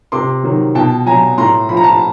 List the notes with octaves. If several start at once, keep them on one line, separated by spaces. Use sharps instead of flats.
C3 C6 D6
D#3 F#3
B2 G5 A5
F#3 G#5 A#5
A2 A#5 C6
F3 B5
A#5
A5 B5